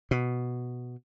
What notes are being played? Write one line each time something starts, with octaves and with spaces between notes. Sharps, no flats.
B2